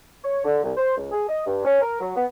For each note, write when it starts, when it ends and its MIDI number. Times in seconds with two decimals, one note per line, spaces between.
0.24 0.44 73
0.45 0.63 50
0.64 0.72 36
0.77 0.96 72
0.97 1.08 37
1.11 1.24 68
1.28 1.44 75
1.45 1.62 43
1.65 1.81 61
1.82 1.98 70
2.00 2.13 54
2.16 2.25 59